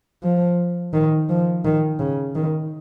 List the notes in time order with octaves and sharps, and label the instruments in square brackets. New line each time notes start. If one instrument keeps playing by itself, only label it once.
[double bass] F3
D#3
F3
D#3
C#3
D#3